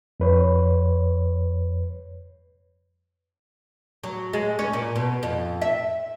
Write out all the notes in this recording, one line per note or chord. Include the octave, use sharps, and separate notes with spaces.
F2 B4 C#5
F#3
G#3
C#4
A#2
B2
F2
E5